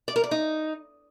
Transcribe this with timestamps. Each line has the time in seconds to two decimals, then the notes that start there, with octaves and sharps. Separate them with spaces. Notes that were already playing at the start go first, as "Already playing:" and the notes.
0.08 D5
0.16 A#4
0.24 D5
0.31 D#4